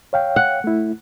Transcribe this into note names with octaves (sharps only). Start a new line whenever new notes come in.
C#5 F5 G5
F#5
A3 E4